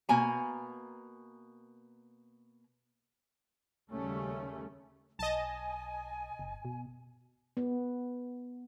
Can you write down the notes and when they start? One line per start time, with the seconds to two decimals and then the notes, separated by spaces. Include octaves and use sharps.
0.09 B2 A#3 G#5 A#5
3.92 D#2 C#3 G3 A3 C#4
5.19 B1 D#5 G#5 A5
6.39 F#1
6.65 B2
7.57 B3